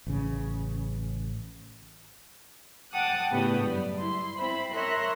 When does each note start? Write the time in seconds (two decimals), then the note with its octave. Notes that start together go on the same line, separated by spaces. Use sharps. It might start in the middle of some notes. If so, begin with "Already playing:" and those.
0.07 A1 C#3
2.93 F#5 G5 A5 D6 D#6 F#6
3.31 A2 C#3 A3 B3 D4 G4
3.63 F#2 G3 D5
3.98 E4 C6
4.37 C4 E4 C5 B5
4.73 A#4 C#5 E5 C6 F#6 A#6